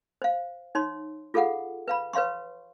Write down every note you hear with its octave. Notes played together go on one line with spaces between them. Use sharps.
C5 F5
D#4 C#5 C6
F4 G#4 A4 F5 F#5
B4 F5 B5
B4 C#5 F5 C6 C#6